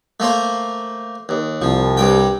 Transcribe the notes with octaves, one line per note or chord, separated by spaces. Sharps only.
A3 A#3 C5
D#2
C2 F3
G2 G3 G5